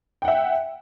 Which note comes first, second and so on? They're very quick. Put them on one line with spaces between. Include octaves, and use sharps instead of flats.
G5 F#5 E5